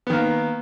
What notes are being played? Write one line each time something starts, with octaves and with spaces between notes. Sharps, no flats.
D#3 A#3 B3